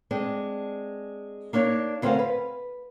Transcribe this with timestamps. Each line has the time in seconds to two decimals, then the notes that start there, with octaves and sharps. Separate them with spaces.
0.11 G#3 C4 D4
1.53 A#3 D4 D#4 C#5
2.02 D2 C4 C#4 A#4 C5 F5
2.19 B4